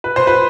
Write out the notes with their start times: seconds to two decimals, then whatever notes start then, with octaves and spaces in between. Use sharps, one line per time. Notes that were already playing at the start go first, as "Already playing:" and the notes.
0.04 B4
0.16 C5
0.27 B4